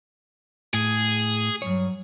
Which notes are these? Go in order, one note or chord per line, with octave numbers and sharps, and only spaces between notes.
A2 G#4
G2 F#3 C#5